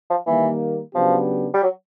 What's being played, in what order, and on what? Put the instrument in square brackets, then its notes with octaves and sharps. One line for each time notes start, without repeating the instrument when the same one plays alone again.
[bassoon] F3
[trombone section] D#3 G3 A#3 [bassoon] E3
[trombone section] C#3 F#3 B3 D4 G4 [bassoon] F3
[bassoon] G3
F#3